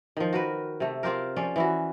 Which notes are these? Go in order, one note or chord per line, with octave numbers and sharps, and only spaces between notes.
D#3 F3
F#4 A#4 B4
C3 A3
C4 F4 G4 A#4
F3 C#4 D5
E3 E4 F#4